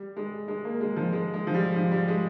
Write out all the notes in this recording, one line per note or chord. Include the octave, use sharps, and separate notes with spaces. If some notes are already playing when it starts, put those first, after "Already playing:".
Already playing: G3
G#3
G#3
A#3
G#3
F3
G#3
G#3
F3
G3
F3
G3
G#3